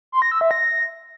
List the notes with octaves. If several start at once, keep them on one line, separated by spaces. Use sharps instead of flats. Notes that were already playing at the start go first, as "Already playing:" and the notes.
C6
A#6
E6
E5
A#6